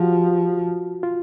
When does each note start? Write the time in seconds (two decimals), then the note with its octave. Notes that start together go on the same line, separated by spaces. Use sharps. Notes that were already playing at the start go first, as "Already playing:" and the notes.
Already playing: F3 F#4 G4
1.03 F4